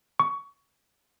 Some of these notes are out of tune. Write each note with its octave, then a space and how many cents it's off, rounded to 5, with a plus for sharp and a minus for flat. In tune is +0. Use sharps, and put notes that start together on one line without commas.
C#6 +20